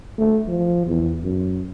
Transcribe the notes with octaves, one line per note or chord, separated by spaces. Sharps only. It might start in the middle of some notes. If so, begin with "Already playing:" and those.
A3
F3
E2
F#2